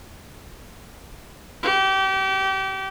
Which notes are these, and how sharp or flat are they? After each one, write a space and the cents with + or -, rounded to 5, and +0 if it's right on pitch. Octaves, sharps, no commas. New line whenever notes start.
G4 -30